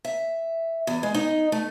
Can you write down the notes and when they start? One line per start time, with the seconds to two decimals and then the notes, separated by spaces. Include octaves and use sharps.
0.05 E5
0.87 E2
1.03 G#3
1.15 D#4
1.52 A3